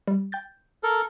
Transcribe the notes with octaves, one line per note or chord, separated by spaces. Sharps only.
G3
G5 G6 A6
A4 A#4